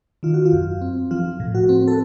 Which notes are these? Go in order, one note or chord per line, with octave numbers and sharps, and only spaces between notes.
D#3 F4
F#4
F4
F#2
C4
F3 F4
A2
F#4
C4
A4